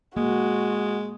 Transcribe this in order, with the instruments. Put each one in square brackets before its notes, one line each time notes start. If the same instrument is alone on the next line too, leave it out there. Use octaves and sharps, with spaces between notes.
[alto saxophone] G#3 [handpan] A#3 [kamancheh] F#4